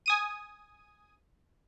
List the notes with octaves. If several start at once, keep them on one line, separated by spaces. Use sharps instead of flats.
G#5 D#6 D#7